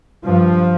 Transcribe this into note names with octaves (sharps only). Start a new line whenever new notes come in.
G2 F3